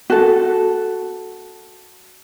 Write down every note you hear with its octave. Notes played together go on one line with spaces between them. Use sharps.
F#4 A4